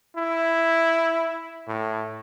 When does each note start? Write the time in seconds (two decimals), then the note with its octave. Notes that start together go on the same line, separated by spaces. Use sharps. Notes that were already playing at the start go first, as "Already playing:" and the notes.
0.17 E4
1.68 A2